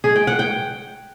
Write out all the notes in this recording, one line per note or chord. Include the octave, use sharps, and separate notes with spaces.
G#4
G5
F#5
G5